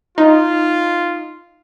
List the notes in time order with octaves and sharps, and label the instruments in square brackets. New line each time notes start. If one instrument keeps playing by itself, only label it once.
[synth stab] D#4 [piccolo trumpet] F4